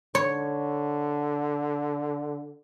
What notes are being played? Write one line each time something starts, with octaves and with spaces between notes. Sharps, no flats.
D3 C#5